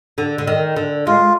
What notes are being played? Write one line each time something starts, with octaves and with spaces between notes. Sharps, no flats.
D3
D3
D#3
D3
G#3 F4